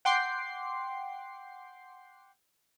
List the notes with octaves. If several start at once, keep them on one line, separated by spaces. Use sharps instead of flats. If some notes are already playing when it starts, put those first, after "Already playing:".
F#5 G5 C6 D6 C7